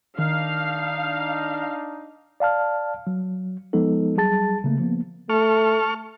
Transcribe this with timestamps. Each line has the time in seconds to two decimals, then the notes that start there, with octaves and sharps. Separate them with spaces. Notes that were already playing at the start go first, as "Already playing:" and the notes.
0.19 D#3 D4 D#4 F5
2.40 D5 F5 A5 F6
3.07 F#3
3.73 F3 G#3 B3 D#4 A4
4.17 F#3 G3 G#4 A5 A6
4.64 C#3 A3 A#3
4.80 F3 A#3 B3
5.29 A3 A4 C#6 F6